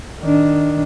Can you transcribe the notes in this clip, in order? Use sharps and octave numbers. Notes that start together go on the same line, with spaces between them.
D#3 D4